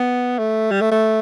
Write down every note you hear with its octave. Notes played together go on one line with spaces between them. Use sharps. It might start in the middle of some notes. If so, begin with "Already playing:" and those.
Already playing: B3
A3
G3
A3
A3